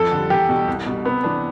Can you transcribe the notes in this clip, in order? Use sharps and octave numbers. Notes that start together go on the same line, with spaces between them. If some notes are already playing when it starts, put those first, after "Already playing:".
Already playing: F2 A4
D3 G3
E2 G4
B2 G3
C2
B2 G3
C3 B3
E3 B3 D4